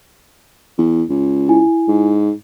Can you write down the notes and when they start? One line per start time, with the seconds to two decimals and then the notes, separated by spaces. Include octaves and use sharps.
0.78 E2
1.10 C#2
1.49 E4 G#5
1.88 G#2